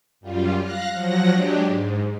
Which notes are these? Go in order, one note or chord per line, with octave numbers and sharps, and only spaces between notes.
F#2 G3 F4
F5 F#6 A#6
F3 F#3 F#5 A#6
F#3 G#3 D4 G4
G#2